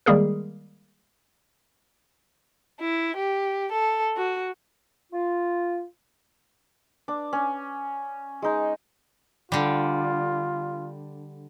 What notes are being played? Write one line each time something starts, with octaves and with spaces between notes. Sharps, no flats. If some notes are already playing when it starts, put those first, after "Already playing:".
D#3 G3 G#3 A#3 G#4 A#4
E4
G4
A4
F#4
F4
D4
C#4
G#3 D#4
D3 G3 F4